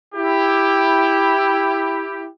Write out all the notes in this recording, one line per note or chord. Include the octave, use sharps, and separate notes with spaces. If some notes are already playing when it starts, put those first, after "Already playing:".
E4 G4